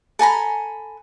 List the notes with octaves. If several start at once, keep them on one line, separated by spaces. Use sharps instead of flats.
A4 G#5 A#5 B5